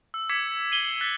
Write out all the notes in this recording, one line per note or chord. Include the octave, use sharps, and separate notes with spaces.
E6
D6 G#6 B6 C#7
C7 D#7 F#7 G7
F#6 A6 B6 C#7